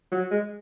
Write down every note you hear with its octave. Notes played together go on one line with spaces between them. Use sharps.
F#3
G#3